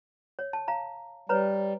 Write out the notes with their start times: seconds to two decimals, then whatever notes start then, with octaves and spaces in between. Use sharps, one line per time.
0.39 C#5
0.53 A5
0.68 F5 A#5
1.29 G3 B4 C#5 A#5